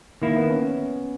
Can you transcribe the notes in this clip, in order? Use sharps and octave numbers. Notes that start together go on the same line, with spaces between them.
D#3 A#3 E4
B3
C#4